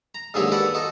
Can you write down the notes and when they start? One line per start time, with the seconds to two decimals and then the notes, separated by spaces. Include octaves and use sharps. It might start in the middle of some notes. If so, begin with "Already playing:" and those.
0.15 A#5
0.34 G#2 D3 D#3 F#3 A#3 G4
0.52 A4 B4 D5 F#5
0.74 D#4 F#4 A4